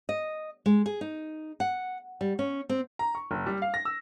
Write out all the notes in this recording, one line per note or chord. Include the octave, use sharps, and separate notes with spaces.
D#5
G#3
G#4
D#4
F#5
G3
C#4
C4
A#5
C#6
F#1
G3
F5
A#6
E6